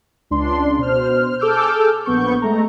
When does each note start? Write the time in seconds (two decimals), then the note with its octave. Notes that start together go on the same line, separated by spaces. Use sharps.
0.31 C#2 D4 C6
0.79 B2 C5 F6
1.39 G#4 A4 D6 E6 F6 G6
2.05 A#1 B3 C#6 G6
2.42 G#3 A3 A#5